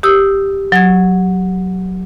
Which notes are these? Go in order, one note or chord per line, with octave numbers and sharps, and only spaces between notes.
G4 D#6 E6
F#3 G#6